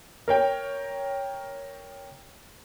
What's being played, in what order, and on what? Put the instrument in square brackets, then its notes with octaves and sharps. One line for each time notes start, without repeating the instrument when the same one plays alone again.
[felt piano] A#4 C#5 G5